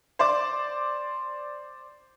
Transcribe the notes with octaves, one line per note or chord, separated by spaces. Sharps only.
C5 D5 D6